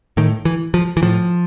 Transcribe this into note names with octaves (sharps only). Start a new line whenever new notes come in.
A2 D#3
E3
F3
E3
A2 F3